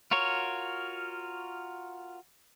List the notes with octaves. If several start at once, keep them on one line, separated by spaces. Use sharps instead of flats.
F4 F#4 A#4 C#5